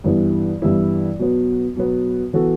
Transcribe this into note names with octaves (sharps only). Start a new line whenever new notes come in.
G2 E3 G3 B3 E4
G2 E3 G3 B3 E4
B2 F#3 B3
B2 F#3 B3
E3 B3 F#4 A4